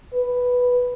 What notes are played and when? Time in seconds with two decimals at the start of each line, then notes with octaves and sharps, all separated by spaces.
0.13 B4